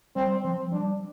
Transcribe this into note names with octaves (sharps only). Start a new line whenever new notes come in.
G3 C4
F3 C4
G3 D4